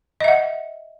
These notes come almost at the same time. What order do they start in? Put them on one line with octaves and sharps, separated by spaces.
D#5 E5 F#5